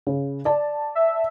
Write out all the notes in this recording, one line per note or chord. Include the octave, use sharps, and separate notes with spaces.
C#3
D5 A5
E5